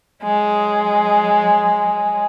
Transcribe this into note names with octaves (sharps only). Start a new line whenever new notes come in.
F#3 G#3